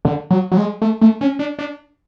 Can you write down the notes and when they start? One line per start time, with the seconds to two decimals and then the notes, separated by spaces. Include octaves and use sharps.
0.05 D3
0.30 F#3
0.52 F#3
0.57 G#3
0.82 A3
1.01 A3
1.21 C#4
1.39 D4
1.59 D4